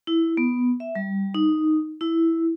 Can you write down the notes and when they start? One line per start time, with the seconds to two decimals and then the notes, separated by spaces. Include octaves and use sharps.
0.07 E4
0.37 B3
0.80 E5
0.95 G3
1.35 D#4
2.01 E4